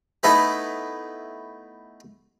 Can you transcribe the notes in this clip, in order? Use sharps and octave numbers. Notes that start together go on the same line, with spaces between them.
A3 B3 D#4 E4 A4